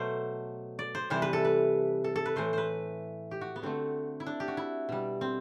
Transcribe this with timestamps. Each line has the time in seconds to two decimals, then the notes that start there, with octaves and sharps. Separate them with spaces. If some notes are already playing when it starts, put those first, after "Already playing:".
Already playing: B2 F#3 A3 A4 C5
0.79 D5
0.95 C5
1.10 C3 E3 G3 C5
1.22 B4
1.33 A4
1.45 B4
2.04 A4
2.16 A4
2.26 B4
2.36 A2 E3 A3 C5
2.53 B4 C5
3.31 G4
3.41 F#4
3.56 B3
3.62 D3 A3 C4
4.20 E4
4.26 D4
4.40 G4
4.48 F#4
4.57 E4
4.89 B2 G3
5.21 C4